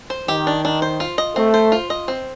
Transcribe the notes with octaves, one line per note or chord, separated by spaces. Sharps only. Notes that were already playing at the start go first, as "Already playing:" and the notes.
C5
D#3 G4
D4
D4
C5
F4
D#5
A3 C4
C5
F4
D#5
C4